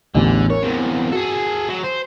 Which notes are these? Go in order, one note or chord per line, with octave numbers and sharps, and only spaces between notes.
A1 E2 A2 D3
A#4 C#5
E2 C3
F#4 G#4 A4
F#3
C5